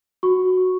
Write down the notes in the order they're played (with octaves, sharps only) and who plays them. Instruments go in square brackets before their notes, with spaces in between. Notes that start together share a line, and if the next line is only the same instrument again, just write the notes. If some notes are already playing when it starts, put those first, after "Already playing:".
[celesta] F#4 C#6